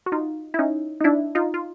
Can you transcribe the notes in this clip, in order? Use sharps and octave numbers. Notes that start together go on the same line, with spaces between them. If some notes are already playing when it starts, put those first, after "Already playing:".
F#4
D#4 F4
E4
C#4 D#4
D#4
D4 E4
D#4 F4
F4